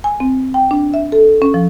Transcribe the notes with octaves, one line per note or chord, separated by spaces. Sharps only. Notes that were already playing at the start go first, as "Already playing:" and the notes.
G#5
C4
G5
D4
E5
A4
C#4
F3